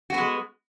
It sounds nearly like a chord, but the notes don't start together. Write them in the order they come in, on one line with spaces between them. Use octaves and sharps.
F#4 B3 G#3